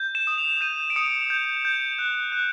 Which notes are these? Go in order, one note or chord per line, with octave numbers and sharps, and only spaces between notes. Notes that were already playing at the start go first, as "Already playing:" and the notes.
Already playing: G6
E7
D#6
F7
G6 D#7
D7
D#6 C#7
G6
G6
F#6
F#6